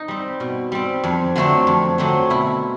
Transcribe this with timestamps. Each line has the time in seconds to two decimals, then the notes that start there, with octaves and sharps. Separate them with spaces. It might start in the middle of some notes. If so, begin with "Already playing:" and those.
Already playing: D#4
0.08 G3 C4
0.40 B2
0.72 G3 C4
1.04 F2
1.35 D3 F#3 A3 C4
1.67 F2
1.98 D3 F#3 A3 C4
2.30 B2 E4